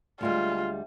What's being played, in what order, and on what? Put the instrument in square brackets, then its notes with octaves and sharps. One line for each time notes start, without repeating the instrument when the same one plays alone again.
[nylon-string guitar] D2 G3 G#3 [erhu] F4